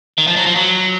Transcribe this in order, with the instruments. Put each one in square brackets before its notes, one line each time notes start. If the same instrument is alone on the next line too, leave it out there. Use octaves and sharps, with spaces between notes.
[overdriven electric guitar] D#3
F3
F#3
F3
F#3